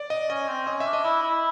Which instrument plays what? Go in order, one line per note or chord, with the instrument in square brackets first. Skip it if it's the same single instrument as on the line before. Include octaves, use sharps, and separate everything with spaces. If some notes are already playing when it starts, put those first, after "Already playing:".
Already playing: [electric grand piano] D5
D#5
[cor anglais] C#4 [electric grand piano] D#5
[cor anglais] C4
[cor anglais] C#4 [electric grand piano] D#5
[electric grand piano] E5
[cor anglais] D4
[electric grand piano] D#5
[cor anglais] E4
E4